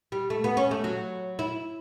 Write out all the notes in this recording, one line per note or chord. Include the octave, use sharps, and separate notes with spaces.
G3
A3
B3
C#4
A3
F#3
E4